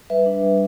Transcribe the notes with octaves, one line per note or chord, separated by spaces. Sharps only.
G3 B4 E5
D4
G3